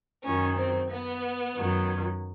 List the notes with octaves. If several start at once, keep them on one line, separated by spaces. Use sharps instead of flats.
F#2 D#3 F#3 C#4
C4
B3
F#2 D#3 F#3